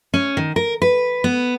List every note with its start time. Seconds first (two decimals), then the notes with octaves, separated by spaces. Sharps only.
0.14 C#4
0.37 D#3
0.56 A#4
0.82 B4
1.24 B3